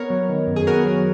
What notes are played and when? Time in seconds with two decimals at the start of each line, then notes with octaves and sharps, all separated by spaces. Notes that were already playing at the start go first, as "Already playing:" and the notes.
Already playing: B3 A#4 C#5
0.10 F#3
0.29 D#3
0.47 F#2
0.56 G#4
0.67 B3 F#4 A#4
0.85 F#3